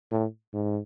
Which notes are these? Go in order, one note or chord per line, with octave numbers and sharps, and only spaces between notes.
A2
G#2